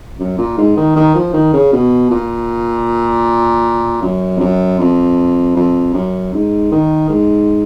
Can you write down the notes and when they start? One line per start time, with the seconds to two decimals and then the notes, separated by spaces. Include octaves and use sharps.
0.19 F#2
0.38 A#2
0.58 G#2
0.77 D#3
0.95 D#3
1.15 F3
1.33 D#3
1.53 C#3
1.72 B2
2.11 A#2
4.02 F#2
4.37 F2
4.40 F#2
4.79 F2
5.56 F2
5.94 F#2
6.33 G#2
6.72 D#3
7.09 G#2